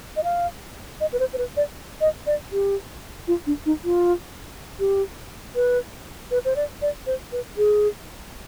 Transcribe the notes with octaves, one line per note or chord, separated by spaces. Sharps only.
D#5
F5
D#5
B4
C5
C5
B4
D5
D#5
D5
G4
F4
D4
D#4
F4
G4
B4
B4
C5
D5
D5
C5
B4
G#4